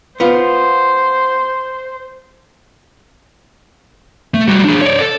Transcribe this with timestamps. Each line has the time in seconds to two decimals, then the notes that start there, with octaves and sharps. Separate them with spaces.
0.20 B3 F4 C5
4.34 A3
4.48 G3 F#4
4.64 D4 G#4
4.82 C#5 D5
5.00 A4